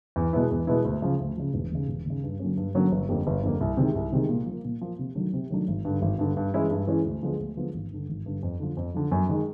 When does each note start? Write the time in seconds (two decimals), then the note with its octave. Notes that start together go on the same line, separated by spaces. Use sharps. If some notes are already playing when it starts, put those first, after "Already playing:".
0.16 E2
0.33 B2 G#3 B3 E4
0.51 E2
0.67 B2 G#3 B3 E4
0.84 D2
1.02 C#3 F3
1.20 D2
1.37 C#3 F3
1.54 E1
1.72 D#2 C#3
1.88 E1
2.05 D#2 C#3
2.23 G2
2.39 D3 F#3 A#3 C#4
2.57 G2
2.75 D3 F#3 A#3 C#4
2.92 G1
3.09 F2 D3 G3 A#3
3.27 G1
3.43 F2 D3 G3 A#3
3.61 C2
3.77 C3 D#3 G#3
3.95 C2
4.13 C3 D#3 G#3
4.29 A#2
4.46 F3 A#3
4.65 A#2
4.81 F3 A#3
4.99 C3
5.15 D#3 F#3 A3 D4
5.33 C3
5.50 D#3 F#3 A3 D4
5.68 G#1
5.85 G2 D3
6.02 G#1
6.19 G2 D3
6.37 G2
6.54 E3 G#3 C#4 E4
6.71 G2
6.87 E3 G#3 C#4 E4
7.05 D2
7.23 D3 F3 G#3 B3
7.39 D2
7.57 D3 F3 G#3 B3
7.74 G#1
7.91 G2 D3
8.09 G#1
8.26 G2 D3
8.43 F2
8.60 D3 F3
8.77 F2
8.94 D3 F3
9.12 F#2
9.29 D#3 G#3